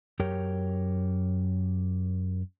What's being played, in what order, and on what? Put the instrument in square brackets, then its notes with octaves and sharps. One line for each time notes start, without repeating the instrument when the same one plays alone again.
[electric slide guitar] F#2 G4 A#4 C#5 G5